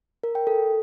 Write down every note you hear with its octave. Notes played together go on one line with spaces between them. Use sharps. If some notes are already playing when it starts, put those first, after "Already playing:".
A#4
G5
A4